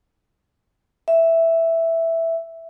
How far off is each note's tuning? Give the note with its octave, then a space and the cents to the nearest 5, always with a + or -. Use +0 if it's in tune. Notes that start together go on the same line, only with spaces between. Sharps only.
E5 +0